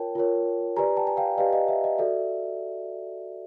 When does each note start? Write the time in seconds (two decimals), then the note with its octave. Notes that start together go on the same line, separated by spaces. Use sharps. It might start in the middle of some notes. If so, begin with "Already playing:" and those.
Already playing: F4 A#4 C#5 G5 A5
0.15 F4 A#4 C#5
0.76 G4 B4 D5 G#5 A#5
0.97 G5 A5
1.07 G#5
1.17 F5 G5
1.37 G4 B4 D5 D#5 F5
1.53 D#5 F5
1.68 E5
1.84 D#5
1.98 F#4 A4 D5 E5